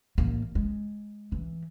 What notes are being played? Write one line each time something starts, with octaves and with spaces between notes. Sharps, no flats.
A1 A#3
G#3
E3